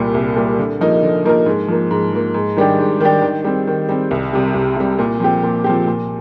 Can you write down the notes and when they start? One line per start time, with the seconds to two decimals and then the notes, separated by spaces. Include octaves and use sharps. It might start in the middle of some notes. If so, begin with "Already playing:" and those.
Already playing: C2 A#2 G3
0.14 C2
0.36 A#2 G3
0.59 D3
0.81 F3 A#3 D#4 A#4
1.03 D3
1.25 F3 A#3 D#4 A#4
1.46 G#2
1.68 F3 A#3
1.91 G#2
2.13 F3 A#3
2.34 G#2
2.57 D#3 G3 D4 G4
2.79 G#2
3.00 D#3 G3 D4 G4
3.22 D#3
3.44 G3 C4
3.67 D#3
3.89 G3 C4
4.11 C2
4.33 C3 G3
4.54 C2
4.77 C3 G3
4.99 A#2
5.20 F3 C4 G4
5.43 A#2
5.64 F3 C4 G4
5.87 A#2